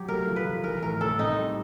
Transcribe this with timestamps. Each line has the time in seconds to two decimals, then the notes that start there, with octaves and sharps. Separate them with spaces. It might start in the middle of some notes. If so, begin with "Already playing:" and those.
Already playing: F#3 G4
0.08 A3 A#4
0.27 F3
0.36 B4
0.46 F3
0.64 E3 A#4
0.82 A2 A#4
1.01 A2 A4
1.19 C4 D#4
1.38 G3